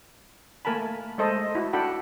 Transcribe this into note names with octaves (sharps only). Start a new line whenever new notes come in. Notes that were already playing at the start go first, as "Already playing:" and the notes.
A3 A#3 A#4 G#5 A5 B5
G#3 A3 A4 C5 D#5
E4 F#4
D4 F#4 A4 F#5 G5 B5